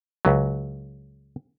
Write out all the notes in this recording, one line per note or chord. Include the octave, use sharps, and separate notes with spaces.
C#2 F#3